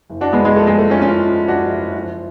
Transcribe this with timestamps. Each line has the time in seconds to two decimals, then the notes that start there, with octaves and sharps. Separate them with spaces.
0.10 F#1
0.21 D4 F#4
0.33 F#1 G#3 B3
0.45 G#3
0.55 F3 A3
0.67 G#3
0.78 F#1 A3
0.90 C#4 F4
1.01 F#1 C#4 F4
1.25 F3
1.48 F#1 D4 F#4
1.72 F#1
1.95 F3